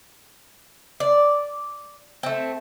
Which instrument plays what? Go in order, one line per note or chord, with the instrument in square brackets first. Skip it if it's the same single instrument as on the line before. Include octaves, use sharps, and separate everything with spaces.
[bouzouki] D5
A3 C4